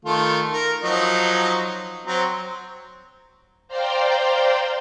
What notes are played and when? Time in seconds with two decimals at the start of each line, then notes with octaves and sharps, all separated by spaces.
0.05 D#3 A3 F4
0.53 A#4
0.83 F3 F#3 D#4
2.06 F#3 C4 A#5
3.68 C5 D5 F5 G5 A#5 C6